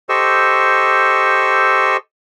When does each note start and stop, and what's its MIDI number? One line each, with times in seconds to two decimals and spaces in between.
0.09 1.97 67
0.09 1.97 69
0.09 1.97 72
0.09 1.97 75
0.09 1.97 85
0.09 1.97 88